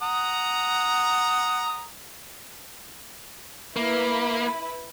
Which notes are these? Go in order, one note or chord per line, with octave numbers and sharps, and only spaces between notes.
F#5 A#5 D#6
A#3 E4 B4